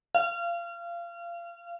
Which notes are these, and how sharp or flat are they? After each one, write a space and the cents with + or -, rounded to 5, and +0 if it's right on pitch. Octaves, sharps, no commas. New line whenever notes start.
F5 -25